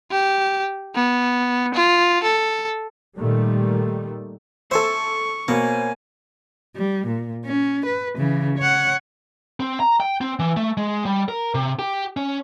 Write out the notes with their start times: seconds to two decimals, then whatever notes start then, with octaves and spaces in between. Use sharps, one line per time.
0.11 G4
0.95 B3
1.75 F4
2.24 A4
3.17 A#2 D#3 G3 A3
4.71 A4 C5 E5 G#5 C#6
5.48 B2 A#3 C5 C#5 G#5
6.76 G3
7.07 A#2
7.45 C#4
7.85 B4
8.17 C#3 E3
8.58 C#5 F#5
9.60 C4
9.80 A#5
10.00 G5
10.21 C4
10.39 E3
10.57 A3
10.77 G#3
11.05 G3
11.28 A#4
11.55 C3
11.79 G4
12.17 C#4